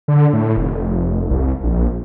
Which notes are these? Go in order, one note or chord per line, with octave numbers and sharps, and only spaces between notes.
D3
A2
F1
C2
A#1